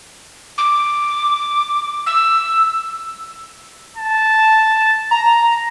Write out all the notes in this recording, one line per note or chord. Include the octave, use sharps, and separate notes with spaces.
D6
E6
A5
A#5